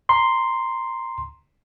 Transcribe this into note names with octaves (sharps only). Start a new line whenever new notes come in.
A#5 C6